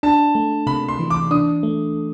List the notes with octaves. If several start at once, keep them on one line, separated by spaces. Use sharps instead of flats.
D4 A5
A3
C3 B5
C6
E3
D6
D4 D#6
A3